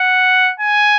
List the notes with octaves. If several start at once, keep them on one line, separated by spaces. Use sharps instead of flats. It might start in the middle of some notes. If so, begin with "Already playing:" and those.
Already playing: F#5
G#5